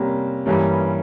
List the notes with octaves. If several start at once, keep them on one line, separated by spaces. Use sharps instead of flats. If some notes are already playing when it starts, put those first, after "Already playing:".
Already playing: C3 G3 A#3 C#4
G2 E3 G3 A#3 C#4